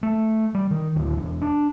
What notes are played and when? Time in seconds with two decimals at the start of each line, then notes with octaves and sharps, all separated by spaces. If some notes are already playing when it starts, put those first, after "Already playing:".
0.03 A3
0.55 G3
0.71 D#3
0.96 D1
1.17 E1
1.41 D4